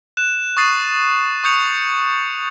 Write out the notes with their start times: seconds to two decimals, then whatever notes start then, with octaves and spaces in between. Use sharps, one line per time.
0.17 F#6 E7
0.57 C#6 D#6 A6 C7 D#7
1.44 C#6 D#6 G6 C#7 F7